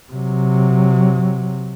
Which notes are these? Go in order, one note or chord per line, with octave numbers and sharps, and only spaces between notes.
C3 F#3